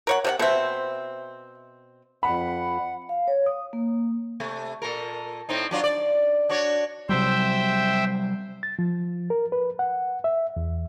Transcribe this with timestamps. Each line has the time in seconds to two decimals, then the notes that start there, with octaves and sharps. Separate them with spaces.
0.07 A#4 C#5 F#5
0.24 C3 D4 F#5
0.39 B2 C4 C5 E5
2.23 F2 F#5 B5
3.09 F5
3.28 C#5
3.46 D#6
3.73 A#3
4.40 C3 A3
4.82 A#2 A4 A#4
5.49 A2 C4 D#4
5.71 F#3 D4 F4
5.84 D5
6.49 D4 F#4 C#5
7.09 C3 F#3 G3 C5 E5 G5
8.63 A6
8.79 F3
9.30 A#4
9.52 B4
9.79 F#5
10.24 E5
10.57 E2